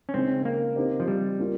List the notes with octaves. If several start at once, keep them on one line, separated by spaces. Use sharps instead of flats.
C#4
C#3 G#3 C4 D#4
A#3
C4 D#4 G4 C5
F3
G3
A#3 C#4 F4